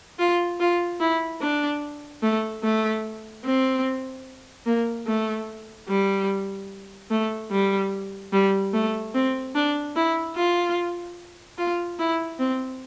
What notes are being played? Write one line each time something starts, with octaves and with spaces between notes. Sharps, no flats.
F4
F4
E4
D4
A3
A3
C4
A#3
A3
G3
A3
G3
G3
A3
C4
D4
E4
F4
F4
E4
C4